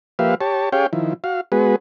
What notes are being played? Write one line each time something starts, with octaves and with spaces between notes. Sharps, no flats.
F3 A#3 G4 B4 E5 F5
G4 C#5 A5
C#4 G4 G#4 C#5 F5 G5
D#3 F3 E4
F#4 F5
G#3 B3 F#4 G#4 B4